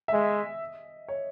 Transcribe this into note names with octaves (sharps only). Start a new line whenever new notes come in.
E5
G#3 D#5
C#5